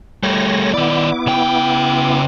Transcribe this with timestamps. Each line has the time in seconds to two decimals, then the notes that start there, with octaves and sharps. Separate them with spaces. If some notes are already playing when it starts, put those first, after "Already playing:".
0.23 G3 A3 C#5 A#6
0.74 D#3 B3 E4 D5 D6
1.27 C#3 G5